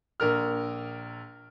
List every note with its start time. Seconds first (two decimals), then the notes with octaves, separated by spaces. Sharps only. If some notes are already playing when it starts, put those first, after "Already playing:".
0.20 A#1 A#4 F6